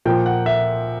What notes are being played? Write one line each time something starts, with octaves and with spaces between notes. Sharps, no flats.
A#2 F3 A#3 G5
F#5
E5